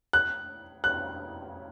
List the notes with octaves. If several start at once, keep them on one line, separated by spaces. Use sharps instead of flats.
F#6
F#6